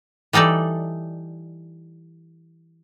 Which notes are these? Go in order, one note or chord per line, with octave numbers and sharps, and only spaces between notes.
E3 G3 D#4 A4 D5